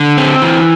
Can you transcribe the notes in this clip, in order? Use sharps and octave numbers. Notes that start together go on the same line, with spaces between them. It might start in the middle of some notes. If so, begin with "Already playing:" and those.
Already playing: D3
C4
E3